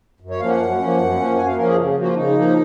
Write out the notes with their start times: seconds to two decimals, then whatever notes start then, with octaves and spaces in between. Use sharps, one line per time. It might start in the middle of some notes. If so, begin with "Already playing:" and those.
0.20 F#2
0.30 C#5
0.40 F3 A#3 C#4 F5
0.50 F#5
0.60 F#2
0.79 F3 A#3 C#4
0.98 F#2
1.17 F3 A#3 C#4
1.37 F#2 G#5
1.47 F5
1.57 F3 A#3 C#4 A#4
1.67 G#4
1.76 C#3
1.95 F3 A#3 F#4
2.07 F4
2.15 C#3 D#4
2.35 F3 A#3